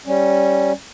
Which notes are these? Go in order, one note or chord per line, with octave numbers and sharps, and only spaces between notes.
G3 C#4